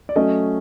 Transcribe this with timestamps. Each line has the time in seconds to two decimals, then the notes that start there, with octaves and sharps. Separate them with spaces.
0.09 D5
0.16 F#3 A3 C#4 D#5